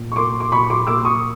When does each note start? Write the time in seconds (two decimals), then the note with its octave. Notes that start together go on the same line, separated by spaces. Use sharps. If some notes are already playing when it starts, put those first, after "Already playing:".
Already playing: A#2
0.12 C#6
0.16 A#3 C6 D6
0.40 D6
0.51 A#2 B5 C#6
0.70 C6 D6
0.87 A#3 D6 E6
1.05 C#6 D#6